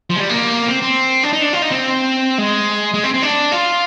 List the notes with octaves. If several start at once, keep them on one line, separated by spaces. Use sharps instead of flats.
F3
G#3
G3
A#3
C4
C4
D4
D#4
D4
F4
D#4
C4
G#3
G#3
C4
C4
D4
F4